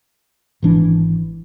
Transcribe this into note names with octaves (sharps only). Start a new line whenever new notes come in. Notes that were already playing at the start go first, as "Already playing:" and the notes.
G#1 E3 D4